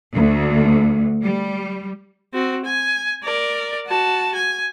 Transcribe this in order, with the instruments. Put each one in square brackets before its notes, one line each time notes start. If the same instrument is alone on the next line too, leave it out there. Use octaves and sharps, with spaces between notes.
[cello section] D2
G3
[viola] C4 F#4
G#5
A#4 D5
F#4 A5
G#5